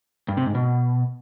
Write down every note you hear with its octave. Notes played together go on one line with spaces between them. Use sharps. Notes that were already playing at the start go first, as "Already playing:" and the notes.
G2
C3
G#2
B2